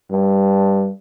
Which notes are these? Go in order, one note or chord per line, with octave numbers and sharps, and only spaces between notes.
G2